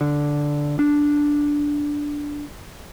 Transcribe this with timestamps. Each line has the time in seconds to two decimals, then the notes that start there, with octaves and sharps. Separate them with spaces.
0.01 D3
0.79 D4